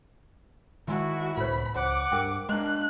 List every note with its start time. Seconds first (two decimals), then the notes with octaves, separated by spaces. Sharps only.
0.88 D#3 G#3 E4 F#4
1.37 C#2 A2 B4 C5 B5
1.75 C#2 C5 F#5 D6
2.12 G2 A#4 G5
2.49 G#3 A#3 D4 F#6